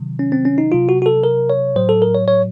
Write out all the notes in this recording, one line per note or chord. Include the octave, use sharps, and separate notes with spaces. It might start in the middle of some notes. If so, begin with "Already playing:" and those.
Already playing: C3 D#3 F#3
C#4
C4
C#4
D#4
C3 F#3 F4
F#4
F#4
A4
A#4
C#5
A2 F#3 C5
A4
A#4
C#5
C#5